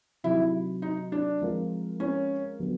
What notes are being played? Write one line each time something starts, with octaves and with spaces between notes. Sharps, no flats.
C3 D#3 F#3 E4
D#4
D4
F3 G#3 C4 F4 A#4
C#4
D3 F#3 B3